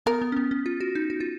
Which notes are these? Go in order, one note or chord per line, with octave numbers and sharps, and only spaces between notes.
B3 A#4
B3
C#4
B3
C#4
F4
F#4
D#4
F#4
F4